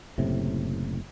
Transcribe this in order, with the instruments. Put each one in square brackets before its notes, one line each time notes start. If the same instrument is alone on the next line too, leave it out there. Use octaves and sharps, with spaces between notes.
[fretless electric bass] F#1 A2 C3